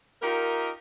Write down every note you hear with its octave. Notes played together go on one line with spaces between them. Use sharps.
D#4 F4 G4 A#4